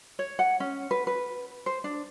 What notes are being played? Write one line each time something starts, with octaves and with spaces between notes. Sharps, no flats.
C#5
F#5
C#4
B4
B4
C5
D4